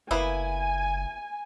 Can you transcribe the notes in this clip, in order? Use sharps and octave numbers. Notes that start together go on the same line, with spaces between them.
F#1 A#3 B3 E4 G#5